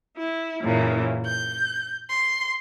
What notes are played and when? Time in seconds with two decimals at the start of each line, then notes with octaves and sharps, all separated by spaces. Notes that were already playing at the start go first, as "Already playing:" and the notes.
0.16 E4
0.61 F#2 A#2 C#3 E3
1.26 G6
2.09 C6